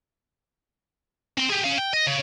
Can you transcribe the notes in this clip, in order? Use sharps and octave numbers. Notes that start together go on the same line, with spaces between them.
C4 C6
G4 G#4
C#4 F5
G5
D#5
C#3